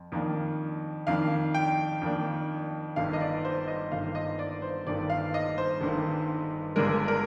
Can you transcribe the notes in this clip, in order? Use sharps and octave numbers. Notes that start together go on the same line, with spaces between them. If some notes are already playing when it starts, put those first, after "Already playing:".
Already playing: F2
F2 D#3 A#3 D4
F2 D#3 A#3 D4 F5
G5
F2 D#3 A#3 D4
G1 G2 D#3 F5
D#5
D5
C5
D#5
G1 G2 D#3 F5
D#5
D5
C5
G1 G2 D#3 D5
F5
D#5
C5
G1 G2 D#3
G1 G2 D3 G#3 D4 A#4
A#4